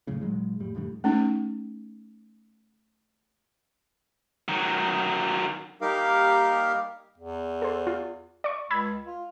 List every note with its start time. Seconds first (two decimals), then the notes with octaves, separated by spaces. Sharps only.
0.07 C#2 F#2 A2 C#3
0.21 A#2 D#3 F#3 G#3
0.60 F2 A2 G3
0.75 F2 A2 D3 G3
1.04 A3 C#4 D#4
4.48 D#3 F#3
5.81 G3 A#3 D#4 G4 A#4 F5
7.18 E2
7.62 A4 C5
7.87 F4
8.44 D5 C#6
8.71 C#2 B5 E6 G#6
9.07 F4